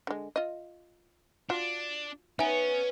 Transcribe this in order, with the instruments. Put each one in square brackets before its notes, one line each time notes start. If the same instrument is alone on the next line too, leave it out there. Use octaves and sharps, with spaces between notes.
[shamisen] D3 G#3
F4 D#5
[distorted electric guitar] D4 [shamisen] F4 F#4
[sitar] B3 [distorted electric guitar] C#4 [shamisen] D#4 [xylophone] E5 G#5